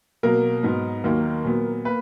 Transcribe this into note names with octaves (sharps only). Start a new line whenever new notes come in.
B2 F#3 A#3 A#4
G#2 F#3 B3
D#2 D#3 F#3 A#3
A#2 F#3 B3
A#3 B4